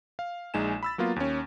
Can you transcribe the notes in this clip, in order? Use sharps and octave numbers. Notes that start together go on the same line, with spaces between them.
F5
A#1 G#3 D#4 G#5 E7
B5 E6 A6
F#3 A#3 B3 F4
D#2 C#4